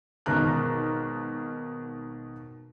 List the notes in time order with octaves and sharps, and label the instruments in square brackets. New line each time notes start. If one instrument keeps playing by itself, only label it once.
[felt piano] G#1 B2 D#3 A#4 A#5 F#6